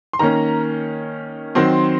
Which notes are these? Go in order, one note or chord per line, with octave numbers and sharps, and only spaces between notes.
C6
D#3 A#3 C#4 A#5
D#3 F#3 C4 C6